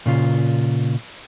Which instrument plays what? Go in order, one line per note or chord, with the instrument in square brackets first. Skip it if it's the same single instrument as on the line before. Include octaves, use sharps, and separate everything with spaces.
[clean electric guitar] A#2 C#3 F4